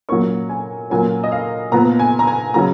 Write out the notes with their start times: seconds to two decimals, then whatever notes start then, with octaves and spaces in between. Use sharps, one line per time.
0.09 A#2 F#3 A#3 C#4 C#6
0.49 G#5
0.90 A#2 F#3 A#3 C#4 G#5
1.24 D#5
1.32 F5
1.72 A#2 F3 B3 A#5
1.99 G#5
2.19 A#5
2.27 G#5
2.54 C#3 F#3 C#4 A#5